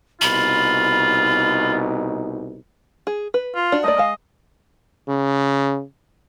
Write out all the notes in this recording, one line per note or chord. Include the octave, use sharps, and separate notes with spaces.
C2 B2 D#4 F4 B5
G#4
B4
F4
D4 F#4
A3 A#3 D5 D#5
G#3 F5
C#3